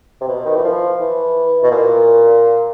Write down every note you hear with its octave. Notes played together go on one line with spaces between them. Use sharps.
C3
B2
D#3
E3
F3
E3
B2
A#2